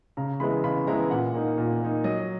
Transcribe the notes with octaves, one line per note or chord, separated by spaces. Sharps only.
C#3 A#5
E3 G#3 B3 E4 B5
C#3 B5
E3 G#3 B3 E4 A#5
A#2 F#5
A#3 D#4
A#2
A#3 D#4
F#3 D#5